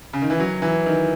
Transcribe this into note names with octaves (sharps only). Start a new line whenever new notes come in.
C#3
D#3
E3
F#3
E3
D#3